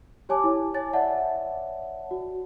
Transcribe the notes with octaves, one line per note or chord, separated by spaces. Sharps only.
G4 C#5 G#5 A5 D6
E4
C#5 G#5 A6
C#5 D5 E5 F#5 A5
F#4